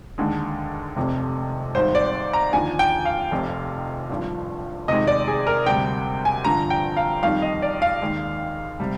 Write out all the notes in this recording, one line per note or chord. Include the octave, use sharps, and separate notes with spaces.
D#2 D3 G#3
F1 F2 C3
G#1 G#2 G3 C5
D5
A#5
D#2 D3 F3 G#5
G5
F5
F1 F2 C3
G#1 G2 F3
F2 C3 D#3 G#3 D#5
D5
G#4
A#4
D2 C3 G3 G5
G#5
G1 G2 D3 F3 A#5
G5
F5
F2 D#3 G3 F5
D#5
D5
F5
D#2 D#3 G#3
C3 G3